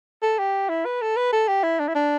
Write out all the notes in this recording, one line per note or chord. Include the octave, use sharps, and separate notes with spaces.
A4
G4
E4
B4
A4
B4
A4
G4
E4
D4
E4
D4